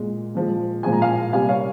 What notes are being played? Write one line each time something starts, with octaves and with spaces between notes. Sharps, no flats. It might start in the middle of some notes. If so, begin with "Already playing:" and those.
Already playing: A#2 G#3
A#2 F3 G#3
A#2 F3 G#3 G#5
A#5
F5 G#5
C3 G3 A#3 F5 G#5
C#5 F5